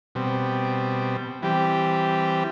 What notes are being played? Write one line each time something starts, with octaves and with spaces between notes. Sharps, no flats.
B2 G3 C4
E3 G3 C4 G4